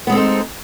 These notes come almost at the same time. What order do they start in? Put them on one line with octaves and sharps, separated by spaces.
B3 G#3 C4 A4 D#4